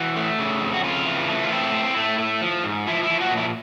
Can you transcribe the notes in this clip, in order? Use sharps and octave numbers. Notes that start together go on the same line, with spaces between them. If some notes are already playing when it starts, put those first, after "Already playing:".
Already playing: E3 F#4
A3
C#3
F2
F#4
C#3 F4
E3
A3
F4
C4 E4
C4
A3
A3
F3
G#2
F3 E4
E4
F3
F#4
A#2
E4